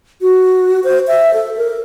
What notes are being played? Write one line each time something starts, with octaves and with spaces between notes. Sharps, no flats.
F#4
C5
E5
A4
A#4